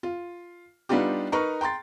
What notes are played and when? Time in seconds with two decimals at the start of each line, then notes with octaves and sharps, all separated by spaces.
0.03 F4
0.89 G3 B3 D4 D#4 F4 G4
1.32 D#4 A#4 B4 A#5 C#6
1.61 G5 A#5 C6 A6